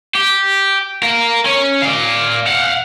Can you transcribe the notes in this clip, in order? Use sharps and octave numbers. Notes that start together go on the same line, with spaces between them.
G4
A#4 F5
C#4
D5 F5
F5 F#5